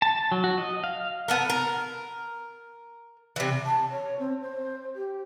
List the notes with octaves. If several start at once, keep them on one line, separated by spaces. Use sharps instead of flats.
A5
F#3
F#4
D#5
F5
B3 A4 A#4
A#4
C3 E3
A5
C#5
C4
C5
G4